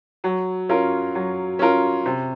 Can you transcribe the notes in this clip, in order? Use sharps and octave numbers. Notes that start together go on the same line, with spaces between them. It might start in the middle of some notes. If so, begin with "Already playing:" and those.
F#3
C#4 F4 A#4
F#3
C#4 F4 A#4
C3